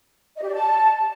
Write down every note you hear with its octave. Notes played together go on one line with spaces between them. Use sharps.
D#5
G4
D5
A5